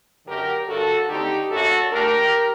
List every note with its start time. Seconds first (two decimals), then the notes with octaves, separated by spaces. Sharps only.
0.26 F#2 D3 F#3 G4 A#4
0.68 G2 D3 F#3 F#4 A4
1.08 D#2 D3 A3 C4 D#4 G4
1.50 F#2 F#3 A#3 D4 F#4 A4
1.91 A#2 A3 D4 G4 A#4